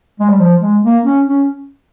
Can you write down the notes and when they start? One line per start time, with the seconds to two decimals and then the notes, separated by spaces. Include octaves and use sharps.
0.20 G#3
0.29 G3
0.39 F3
0.61 G#3
0.84 A#3
1.05 C#4
1.27 C#4